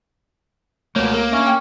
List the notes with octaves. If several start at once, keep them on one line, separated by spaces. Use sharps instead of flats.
C#2 B2 A3 A#3 B4 C#5
A#3 A#4
C#4 D4 E5
G5